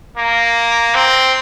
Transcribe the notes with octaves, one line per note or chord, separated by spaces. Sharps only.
A#3
C4